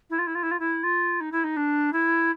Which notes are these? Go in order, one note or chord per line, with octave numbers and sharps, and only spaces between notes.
E4
F4
E4
F4
E4
F4
E4
F4
D#4
E4
D#4
D4
E4